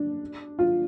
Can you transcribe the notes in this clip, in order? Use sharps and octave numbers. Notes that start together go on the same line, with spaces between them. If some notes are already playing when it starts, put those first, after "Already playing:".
Already playing: D4
F4